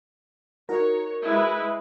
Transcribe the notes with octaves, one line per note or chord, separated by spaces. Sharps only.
D#4 F#4 A#4 C#5
G#3 E4 B4